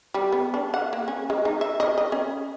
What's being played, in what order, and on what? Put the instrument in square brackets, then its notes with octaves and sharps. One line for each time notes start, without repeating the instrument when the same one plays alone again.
[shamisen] G3
B3
D4
F#5
A#3
C#4
G#3
D#4
E5
D#5
D#5
C#4